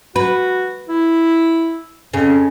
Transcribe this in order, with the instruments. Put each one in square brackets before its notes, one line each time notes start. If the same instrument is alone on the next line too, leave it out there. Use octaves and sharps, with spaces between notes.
[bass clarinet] F#4 [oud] B4
[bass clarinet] E4
[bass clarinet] F2 [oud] C#3